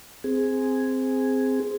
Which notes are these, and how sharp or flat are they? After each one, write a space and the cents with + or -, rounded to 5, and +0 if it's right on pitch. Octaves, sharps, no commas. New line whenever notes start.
C4 -10 G#4 +0